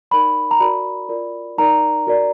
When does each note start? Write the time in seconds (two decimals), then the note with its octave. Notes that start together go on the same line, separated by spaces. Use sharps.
0.11 D#4 A#4 D5 B5
0.51 A#5
0.60 F#4 A#4 D5 B5
1.09 F4 A#4 D5
1.58 D#4 A#4 D5 A#5
2.07 F#4 A#4 D5